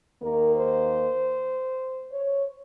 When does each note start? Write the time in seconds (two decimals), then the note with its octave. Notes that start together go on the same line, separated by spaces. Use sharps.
0.22 D#2 D#3 A#3 A#4
0.54 C5
2.11 C#5